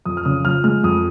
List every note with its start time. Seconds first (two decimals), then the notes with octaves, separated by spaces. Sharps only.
0.05 F2 D#6
0.17 F6
0.25 C#3 D#6
0.45 F3 F6
0.64 G#3 F6
0.84 F2 D#6